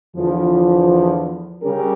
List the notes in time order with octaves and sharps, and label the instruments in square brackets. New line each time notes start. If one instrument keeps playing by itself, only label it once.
[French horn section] E2 D3 F3
C#3 G3 C#4 G4 A#4